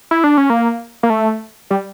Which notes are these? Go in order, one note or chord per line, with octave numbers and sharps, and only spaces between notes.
E4
D4
C#4
A#3
A#3
A3
G3